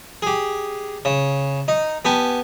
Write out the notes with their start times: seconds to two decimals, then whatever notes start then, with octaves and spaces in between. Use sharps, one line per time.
0.22 G4 G#4
1.05 C#3
1.68 D#4
2.05 B3 G4 G#5 A5